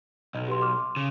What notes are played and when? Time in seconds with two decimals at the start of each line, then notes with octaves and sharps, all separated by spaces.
0.34 B1 D#5
0.48 G4 B4 C6
0.61 C6 D6 F6
0.96 C#3